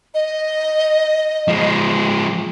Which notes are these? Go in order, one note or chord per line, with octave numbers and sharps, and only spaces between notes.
D#5
F3 G#3